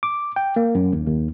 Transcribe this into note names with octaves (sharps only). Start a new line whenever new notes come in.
D6
G5
A#3
F#2
D#2
D#2